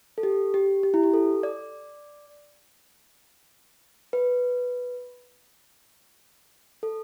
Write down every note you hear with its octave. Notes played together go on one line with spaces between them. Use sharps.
A4
G4
G4
G4
E4
G4
A4
D5
B4
A4